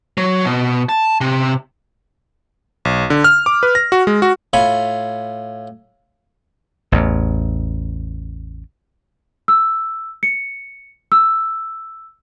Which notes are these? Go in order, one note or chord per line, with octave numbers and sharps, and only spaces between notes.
F#3
B2
A5
C3
B1
D3
F6
D6
B4
A#6
F#4
G#3
F#4
A2 F4 F5 G#5 B5 C#6
A1 E2
E6
C#7
E6